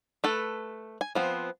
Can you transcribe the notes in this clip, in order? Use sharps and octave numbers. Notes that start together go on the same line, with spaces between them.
A3 A4 B4
G#5
F3 B3 C4